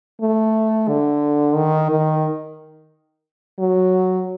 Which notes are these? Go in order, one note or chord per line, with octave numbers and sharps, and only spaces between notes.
A3
D3
D#3
D#3
F#3